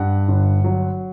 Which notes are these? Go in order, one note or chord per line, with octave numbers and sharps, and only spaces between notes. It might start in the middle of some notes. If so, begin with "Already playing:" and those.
Already playing: G2 F#5
G1
F#3